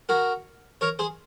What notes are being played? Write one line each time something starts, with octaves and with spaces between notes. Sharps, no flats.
F#4 A#4
A#4 C#5
G#4 C5